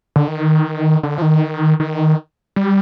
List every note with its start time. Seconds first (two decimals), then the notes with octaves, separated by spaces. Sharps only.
0.16 D3
0.28 D#3
1.03 D3
1.18 F3
1.22 D#3
1.80 D#3
2.56 G3